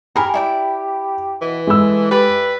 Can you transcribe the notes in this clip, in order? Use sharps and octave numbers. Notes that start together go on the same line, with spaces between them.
G4 G#4 A#4 A#5 B5
E4 D5 G5
B2 E3
G#3 A3 E6
G4 B4 D5 B5